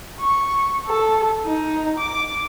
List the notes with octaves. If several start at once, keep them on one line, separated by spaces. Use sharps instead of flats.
C#6
A4
D#4
D6